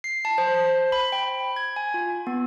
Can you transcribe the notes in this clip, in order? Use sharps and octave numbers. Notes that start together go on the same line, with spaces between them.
C7
A5
C5
C5
B5
G5
G#6
G#5
F4
B3